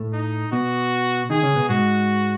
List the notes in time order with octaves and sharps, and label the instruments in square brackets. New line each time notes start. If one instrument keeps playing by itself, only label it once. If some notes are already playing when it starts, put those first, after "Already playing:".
Already playing: [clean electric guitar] A2 A3
[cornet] D#4
[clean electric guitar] B2 B3 [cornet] F#4
[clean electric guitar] D#3 D#4 [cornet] G#4
[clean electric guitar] C#3 C#4
B2 B3
[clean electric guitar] G#2 G#3 [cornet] F#4